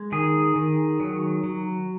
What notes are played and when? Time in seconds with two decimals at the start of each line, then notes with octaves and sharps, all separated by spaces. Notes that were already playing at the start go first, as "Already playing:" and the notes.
Already playing: G#3
0.12 D#3 G#4
0.56 D#3
1.00 F#3
1.44 F#3